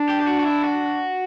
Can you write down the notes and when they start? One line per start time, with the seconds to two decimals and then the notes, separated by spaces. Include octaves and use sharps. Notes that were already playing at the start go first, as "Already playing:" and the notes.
Already playing: D4
0.09 G4
0.20 G4
0.27 F#4
0.39 F#4
0.45 E4
0.64 F#4